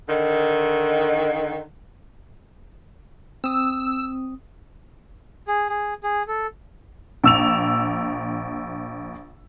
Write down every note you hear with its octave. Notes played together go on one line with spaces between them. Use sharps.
D3 D#3
C4 D#6 E6
G#4
G#4
G#4
A4
A#1 E6 F7